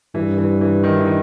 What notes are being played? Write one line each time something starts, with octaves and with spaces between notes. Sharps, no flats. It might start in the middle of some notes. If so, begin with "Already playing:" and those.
G2 E3
E3
E3
D#3
E3
D#3